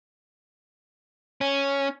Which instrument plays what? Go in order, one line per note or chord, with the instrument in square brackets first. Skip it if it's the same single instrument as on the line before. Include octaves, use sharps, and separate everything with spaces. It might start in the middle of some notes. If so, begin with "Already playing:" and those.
[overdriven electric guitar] C#4